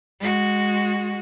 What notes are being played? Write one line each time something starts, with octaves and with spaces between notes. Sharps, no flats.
G#3 F#4